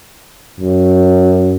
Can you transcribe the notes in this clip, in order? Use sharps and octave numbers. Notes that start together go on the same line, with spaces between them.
F#2